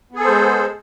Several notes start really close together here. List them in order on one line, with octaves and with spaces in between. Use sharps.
B3 G#4 A4 C5 G#3